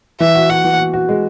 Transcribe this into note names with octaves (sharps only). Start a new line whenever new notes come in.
E3 E5
F#4
F#4 F#5
E3
F#4
F#4
G#3